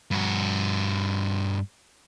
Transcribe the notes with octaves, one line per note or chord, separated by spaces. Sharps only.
G2 F#4